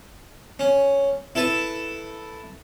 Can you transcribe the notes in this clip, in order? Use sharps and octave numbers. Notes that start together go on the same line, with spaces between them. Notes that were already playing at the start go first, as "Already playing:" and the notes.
C#4
E4 A4 B4 A5